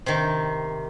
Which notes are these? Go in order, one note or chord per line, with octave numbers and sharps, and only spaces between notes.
C3 D#3